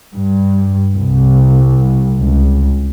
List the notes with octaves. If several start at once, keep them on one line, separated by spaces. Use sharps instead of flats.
G2
C2
C#2